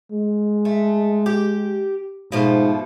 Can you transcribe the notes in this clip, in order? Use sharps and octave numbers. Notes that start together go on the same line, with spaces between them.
G#3
A3
G4
G#2 B2 F3 A3